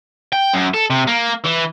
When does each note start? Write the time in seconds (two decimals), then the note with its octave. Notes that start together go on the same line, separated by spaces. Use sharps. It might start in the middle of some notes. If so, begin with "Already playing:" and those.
0.33 G5
0.53 F#2
0.74 A4
0.90 C3
1.07 A#3
1.46 E3